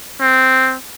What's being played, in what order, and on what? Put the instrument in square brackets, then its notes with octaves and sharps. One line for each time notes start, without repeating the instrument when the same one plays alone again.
[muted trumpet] C4